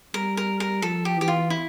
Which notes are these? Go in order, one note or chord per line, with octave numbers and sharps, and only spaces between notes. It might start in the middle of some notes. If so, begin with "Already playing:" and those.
G3 A#4
A#4
A#4
F3 A4
G4
E3 G4
F4
E4